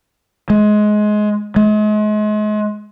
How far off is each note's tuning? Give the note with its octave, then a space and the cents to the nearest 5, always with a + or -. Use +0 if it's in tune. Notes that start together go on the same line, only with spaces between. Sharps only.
G#3 +20
G#3 +35